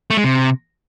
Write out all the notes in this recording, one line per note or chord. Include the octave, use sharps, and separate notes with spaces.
A3
G#3
C3